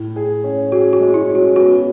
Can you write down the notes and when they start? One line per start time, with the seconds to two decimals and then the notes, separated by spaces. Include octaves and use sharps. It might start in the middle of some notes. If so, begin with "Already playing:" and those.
Already playing: A2
0.16 G#4
0.44 C#4
0.72 F#4 G#4
0.93 F#4
1.00 G#3
1.14 E4
1.28 C#4
1.35 F#4
1.56 B3 F#4